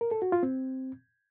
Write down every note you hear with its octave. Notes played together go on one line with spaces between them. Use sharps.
A#4
A4
F#4
F4
C4